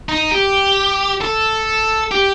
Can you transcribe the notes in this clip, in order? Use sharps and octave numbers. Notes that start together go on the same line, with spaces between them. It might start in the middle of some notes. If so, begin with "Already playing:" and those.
D#4
G4
A4
G4